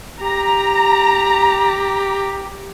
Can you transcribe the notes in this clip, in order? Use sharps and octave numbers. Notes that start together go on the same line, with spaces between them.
G4 A#5